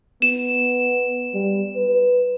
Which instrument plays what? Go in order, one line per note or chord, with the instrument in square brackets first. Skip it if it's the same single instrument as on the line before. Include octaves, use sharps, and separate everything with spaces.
[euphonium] B3 [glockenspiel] E7
[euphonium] G3
B4